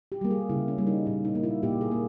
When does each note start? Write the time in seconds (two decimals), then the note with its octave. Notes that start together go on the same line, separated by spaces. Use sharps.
0.12 G4
0.21 G3 A#3
0.31 G#4
0.50 C#3 E4
0.68 C#4
0.78 G3 A#3
0.87 D#4
1.06 A#2 D#4
1.25 D#4
1.35 A#3
1.43 E4
1.63 A#2 G4
1.81 G#4
1.91 A#3